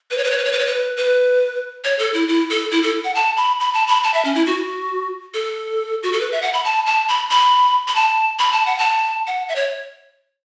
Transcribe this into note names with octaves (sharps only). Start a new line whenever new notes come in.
B4
C#5
B4
C#5
B4
C#5
B4
C#5
B4
B4
C#5
A4
E4
E4
A4
E4
A4
F#5
A5
B5
B5
A5
B5
A5
E5
C#4
E4
F#4
A4
F#4
A4
B4
E5
F#5
B5
A5
A5
B5
B5
B5
A5
B5
A5
F#5
A5
F#5
E5
C#5